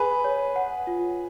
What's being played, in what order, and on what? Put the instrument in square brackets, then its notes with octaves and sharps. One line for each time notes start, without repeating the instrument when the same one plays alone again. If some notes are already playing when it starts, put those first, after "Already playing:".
Already playing: [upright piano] G#4 B4 [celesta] B5
[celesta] C#5
F#5
F4